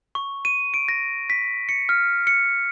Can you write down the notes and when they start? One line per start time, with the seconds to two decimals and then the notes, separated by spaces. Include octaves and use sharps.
0.15 C#6
0.45 D#7
0.74 D7
0.88 A#6
1.30 B6
1.69 C#7
1.89 F6
2.27 C#7